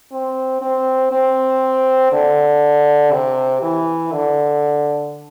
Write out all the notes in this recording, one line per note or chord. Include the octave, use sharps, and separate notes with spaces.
C4
C4
C4
D3
C3
E3
D3